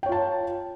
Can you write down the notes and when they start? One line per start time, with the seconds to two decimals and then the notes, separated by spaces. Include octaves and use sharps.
0.03 G5
0.06 C#5
0.09 F4
0.12 A5